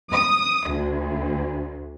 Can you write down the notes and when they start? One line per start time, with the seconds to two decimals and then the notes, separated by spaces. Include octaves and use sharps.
0.12 D#6
0.70 D2